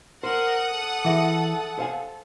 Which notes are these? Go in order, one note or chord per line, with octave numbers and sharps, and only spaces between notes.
A#4 C5 F#5 D#6
A4
E3 G#4 E5 D6
C5 F5 G#5